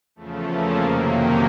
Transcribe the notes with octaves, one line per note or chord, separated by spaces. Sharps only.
E2 C#3 F3 A3
A#3
F2 C3 D#3 F#3 A#3
C#4 D#4